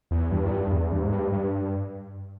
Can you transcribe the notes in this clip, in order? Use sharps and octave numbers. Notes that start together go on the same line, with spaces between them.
E2
G2
E2
G2
E2
G2
G#2
G2
G2